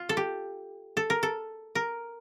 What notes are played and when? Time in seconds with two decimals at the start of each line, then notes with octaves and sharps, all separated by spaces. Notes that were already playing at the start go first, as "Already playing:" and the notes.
Already playing: F4
0.09 A4
0.17 G4
0.97 A4
1.10 A#4
1.23 A4
1.75 A#4